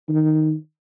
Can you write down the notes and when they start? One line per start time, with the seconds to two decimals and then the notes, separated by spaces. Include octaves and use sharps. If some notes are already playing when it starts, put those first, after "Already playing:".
0.09 D#3